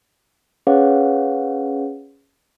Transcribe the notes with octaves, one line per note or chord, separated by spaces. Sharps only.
C#4 G#4 B4 C#5 F5 F#5